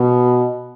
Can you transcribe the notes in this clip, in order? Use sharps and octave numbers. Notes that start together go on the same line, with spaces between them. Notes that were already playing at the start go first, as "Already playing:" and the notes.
Already playing: B2